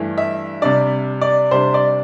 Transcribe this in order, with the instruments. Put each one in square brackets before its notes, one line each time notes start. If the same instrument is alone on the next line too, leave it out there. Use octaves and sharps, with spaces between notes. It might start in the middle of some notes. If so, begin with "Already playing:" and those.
Already playing: [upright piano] G2 E3 A3 E4
E5
C3 G3 D4 D5
D5
C3 G3 D4 C5
D5